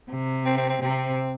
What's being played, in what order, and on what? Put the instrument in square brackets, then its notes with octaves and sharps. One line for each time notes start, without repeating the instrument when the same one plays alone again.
[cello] C3
[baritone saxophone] C4
C4
C4
[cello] C3 [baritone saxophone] C4